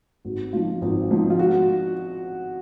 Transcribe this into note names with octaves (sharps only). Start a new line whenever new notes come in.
G#1 F#4
G#2 F3 F4
G#1 F4
G#2 F3
F4
F#4